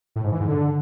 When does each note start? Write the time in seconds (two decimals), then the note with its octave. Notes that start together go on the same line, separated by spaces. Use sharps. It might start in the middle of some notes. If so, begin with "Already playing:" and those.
0.16 A2
0.24 G#2
0.32 E3
0.40 G#2
0.49 D3